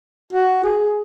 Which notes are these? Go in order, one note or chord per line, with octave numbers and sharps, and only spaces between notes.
F#4
G#4